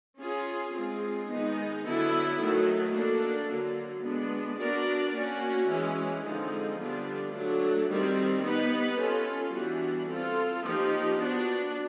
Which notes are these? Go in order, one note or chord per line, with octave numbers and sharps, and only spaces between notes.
C#4 F4 G#4
G#3 C4 F4 G#4
D#3 G#3 B3 D#4
D3 F#3 B3 E4 A4
D#3 F#3 A3
A#3 D4 F#4 A4
D3 F#3 A#3
G#3 B3 D4
B3 D4 F#4 A#4 D5
A#3 C#4 F#4
E3 G#3 C#4
D3 F3 G#3 C4 D#4
D3 G3 B3 D4 F4
F#3 A3 D4
D#3 G3 C4
B3 D#4 G4 B4
C#4 F4 A4
E3 G3 B3 D4 F#4
C4 F4 A4
F3 A#3 D#4 G4
B3 D4 F#4